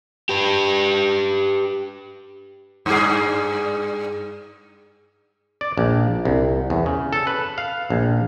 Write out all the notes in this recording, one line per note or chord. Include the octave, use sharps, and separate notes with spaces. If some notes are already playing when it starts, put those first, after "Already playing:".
G4 B4
G2 G#4
D5
A#1
C2
E2
C#3
A4
B4
F5
A#1